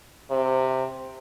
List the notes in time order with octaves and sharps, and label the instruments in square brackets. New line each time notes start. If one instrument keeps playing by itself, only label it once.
[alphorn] C3